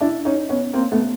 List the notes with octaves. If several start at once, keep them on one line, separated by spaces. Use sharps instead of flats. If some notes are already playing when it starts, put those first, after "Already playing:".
D4 E4
C#4 D#4
B3 C#4
A#3 C4
A3 B3